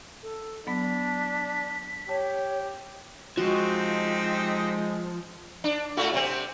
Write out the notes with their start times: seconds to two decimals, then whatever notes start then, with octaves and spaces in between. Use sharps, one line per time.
0.22 A4
0.67 F#3 B3 D4 B6
2.09 G4 C#5 A5
3.37 F3 G#3 C4 D#4 F#4 G4
5.64 D4
5.97 A2 A3 F#4
6.13 C3 C4